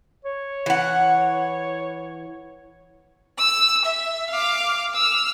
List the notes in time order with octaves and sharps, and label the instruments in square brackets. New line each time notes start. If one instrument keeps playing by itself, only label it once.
[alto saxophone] C#5
[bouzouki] E3 F#5
[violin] E6
E5
F5 D6
E6 F6